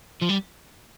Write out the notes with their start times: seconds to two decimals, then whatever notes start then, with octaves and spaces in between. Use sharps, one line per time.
0.22 F3
0.30 G3